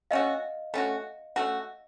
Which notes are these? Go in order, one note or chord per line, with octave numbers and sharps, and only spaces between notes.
A3 C#4 F#4 D#5 F5
A3 C#4 F#4
A3 C#4 F#4